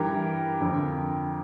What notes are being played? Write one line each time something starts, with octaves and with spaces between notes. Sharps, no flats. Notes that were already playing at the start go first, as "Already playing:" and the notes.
Already playing: G2 E3 G4 A#4
F2 D3 F3